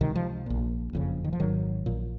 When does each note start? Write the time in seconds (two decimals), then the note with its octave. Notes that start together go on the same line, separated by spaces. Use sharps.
0.01 C#2 C3 D#3
0.15 F3
0.46 A#1 A#2
0.93 F#1 F2 C#3
1.24 D#3
1.33 F3
1.40 G#1 G#2 D#3 F#3
1.86 A#1 A#2